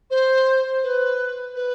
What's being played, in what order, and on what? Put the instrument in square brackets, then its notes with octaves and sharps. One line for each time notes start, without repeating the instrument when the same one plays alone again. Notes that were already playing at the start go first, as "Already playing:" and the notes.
[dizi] C5
B4
B4